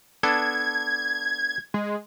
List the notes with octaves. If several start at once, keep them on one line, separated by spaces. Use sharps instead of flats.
B3 D4 A4 G#6
G#3